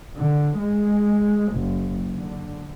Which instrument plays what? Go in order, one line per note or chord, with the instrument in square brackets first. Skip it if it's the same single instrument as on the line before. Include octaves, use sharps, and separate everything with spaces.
[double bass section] D3
G#3
F#1
D3